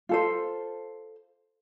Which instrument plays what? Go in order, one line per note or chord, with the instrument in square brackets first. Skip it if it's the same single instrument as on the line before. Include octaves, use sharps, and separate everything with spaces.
[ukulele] F4 A4 C5